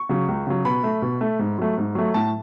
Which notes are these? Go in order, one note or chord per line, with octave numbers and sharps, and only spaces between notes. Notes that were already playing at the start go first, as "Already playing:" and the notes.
Already playing: C#6
C#3 F#3
C#2
C#3 F#3
B2 B5
A3
B2
A3
G#2
F#3 A3
G#2
F#3 A3
A2 A5